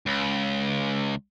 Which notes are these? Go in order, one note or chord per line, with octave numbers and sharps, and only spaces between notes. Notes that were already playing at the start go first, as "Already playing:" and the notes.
C#2